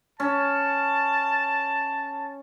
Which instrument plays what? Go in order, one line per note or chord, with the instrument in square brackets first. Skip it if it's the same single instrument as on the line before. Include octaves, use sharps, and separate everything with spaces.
[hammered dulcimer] C#4 [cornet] A5